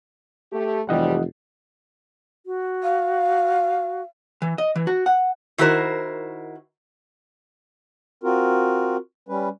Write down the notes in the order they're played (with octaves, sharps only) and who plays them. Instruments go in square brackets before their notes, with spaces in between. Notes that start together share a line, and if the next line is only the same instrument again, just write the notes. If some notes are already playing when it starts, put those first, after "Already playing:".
[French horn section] A3 G4
[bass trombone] F1 [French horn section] F2 G#2 G3 [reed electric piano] E3 D#5 F#5
[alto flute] F#4
[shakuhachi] F5
[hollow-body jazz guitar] E3
D#5
E3
F#4
F#5
[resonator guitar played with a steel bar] D#3 E4 F#4 A#4 C5
[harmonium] C4 F4 F#4 A#4
G3 C#4 B4